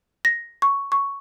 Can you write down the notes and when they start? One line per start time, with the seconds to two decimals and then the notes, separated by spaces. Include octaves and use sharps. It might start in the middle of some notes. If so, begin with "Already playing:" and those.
0.25 A#6
0.62 C#6
0.92 C#6